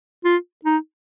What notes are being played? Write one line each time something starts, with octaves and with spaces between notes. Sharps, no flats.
F4
D#4